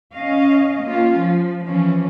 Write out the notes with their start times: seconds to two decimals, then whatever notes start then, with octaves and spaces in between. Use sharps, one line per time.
0.15 C#4 D#5 F5
0.84 A#3 C#4 F4
1.20 F3
1.66 E3 F3 C#4